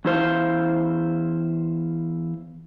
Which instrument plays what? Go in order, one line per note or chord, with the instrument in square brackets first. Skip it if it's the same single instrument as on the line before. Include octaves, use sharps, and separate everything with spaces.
[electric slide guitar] E2 E4 C5 F5